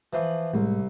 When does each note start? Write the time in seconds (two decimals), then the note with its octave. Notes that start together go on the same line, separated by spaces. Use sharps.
0.13 E3 F3
0.54 C2 A2 G#3